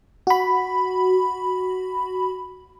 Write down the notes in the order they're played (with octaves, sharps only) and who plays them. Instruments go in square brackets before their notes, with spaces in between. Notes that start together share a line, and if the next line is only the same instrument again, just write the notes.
[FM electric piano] F#4 B5